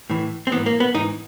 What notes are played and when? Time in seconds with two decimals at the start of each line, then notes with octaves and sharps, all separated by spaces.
0.10 A2 E3
0.47 C4
0.52 E3 B3
0.56 G#2
0.66 A#3
0.80 B3
0.94 G#2 E3 D#4